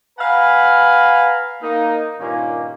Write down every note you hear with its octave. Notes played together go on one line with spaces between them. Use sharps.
B4 F5 F#5 G#5 A#5 B5
A#3 D#4
G2 A#2 D#3 A#3 C#4